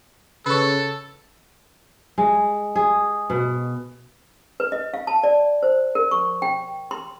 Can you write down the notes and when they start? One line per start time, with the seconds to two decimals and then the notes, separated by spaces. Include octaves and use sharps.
0.46 C#3 A4 B4 C#5
2.18 G#3
2.76 G#4
3.30 B2
4.60 B4
4.72 D#5
4.94 F5
5.07 A5
5.24 D5
5.63 C5
5.95 A#4
6.11 C#6
6.42 G5
6.91 C6